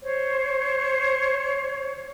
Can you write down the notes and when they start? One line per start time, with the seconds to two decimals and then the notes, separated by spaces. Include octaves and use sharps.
0.01 C5 C#5